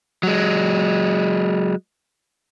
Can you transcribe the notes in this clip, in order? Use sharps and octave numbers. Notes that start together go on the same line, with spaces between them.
F#3 G#3